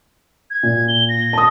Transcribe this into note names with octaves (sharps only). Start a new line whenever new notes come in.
G#6
A#2
G7
A#6
A5 D#6